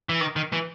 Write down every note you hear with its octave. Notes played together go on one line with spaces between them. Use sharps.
E3
D#3
D#3
E3